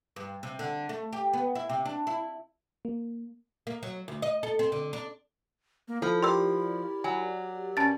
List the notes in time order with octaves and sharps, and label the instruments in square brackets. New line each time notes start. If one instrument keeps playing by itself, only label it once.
[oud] G2
C3
D3
A3
G4
B3
E4
C3
D4
E4
[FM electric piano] A#3
[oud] A#3
F#3
D2
D#5
A4
C4
D3
D4
[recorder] A#3
[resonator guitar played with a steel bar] F3 [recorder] E4 [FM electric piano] A4
[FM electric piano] G4 A#4 D5 [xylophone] C6 E6
[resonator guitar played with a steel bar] F#3 [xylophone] G#5
[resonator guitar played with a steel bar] B2 [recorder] C#4 [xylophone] A5 A6